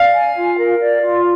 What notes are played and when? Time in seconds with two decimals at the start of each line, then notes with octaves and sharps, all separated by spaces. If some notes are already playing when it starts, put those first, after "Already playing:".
Already playing: D5 F5
0.13 G#5
0.35 F4
0.58 A#4
0.80 D5
1.02 F4